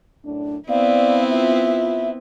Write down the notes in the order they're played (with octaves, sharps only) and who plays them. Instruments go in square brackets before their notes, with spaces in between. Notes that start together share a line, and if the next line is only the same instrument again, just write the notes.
[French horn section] F#2 A2 D4
[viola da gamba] B3 C4 E4 [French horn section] D5 [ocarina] F5
[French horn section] F4 [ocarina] E5